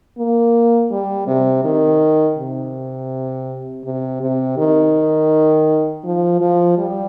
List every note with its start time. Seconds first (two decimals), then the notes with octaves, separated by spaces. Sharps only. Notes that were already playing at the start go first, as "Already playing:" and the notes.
0.18 A#3
0.91 G3
1.27 C3
1.65 D#3
2.38 C3
3.85 C3
4.21 C3
4.58 D#3
6.04 F3
6.41 F3
6.78 G3